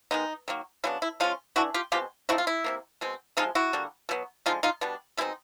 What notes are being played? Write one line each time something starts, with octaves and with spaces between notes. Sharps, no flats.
D#3 G#3 B3 D#4
D#3 F#3 A#3
C#3 F#3 B3 D4 E4
E4
F3 G#3 C#4 D#4 F4
E3 A3 D4 E4 F#4
F4 G4
B2 G#3 C4 F4 G4
F3 A3 C4 D#4 E4 F#4
F4
E4
C3 F3 A#3
B2 G#3 C4
C3 F3 G#3 D#4 F4
E4 F#4
D3 G3 A#3
B2 F#3 B3
D3 F3 G#3 D#4 F4
D#4 F4
B2 G3 B3 D4
B2 G#3 C4 D#4 E4